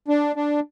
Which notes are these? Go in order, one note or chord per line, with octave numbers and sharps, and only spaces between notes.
D4
D4